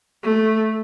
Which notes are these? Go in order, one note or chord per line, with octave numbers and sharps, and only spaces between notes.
A3